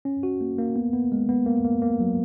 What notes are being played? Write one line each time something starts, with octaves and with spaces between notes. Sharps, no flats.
C#4
F#4
A#3
A#3
B3
B3
G#3
B3
A#3
A#3
A#3
F#3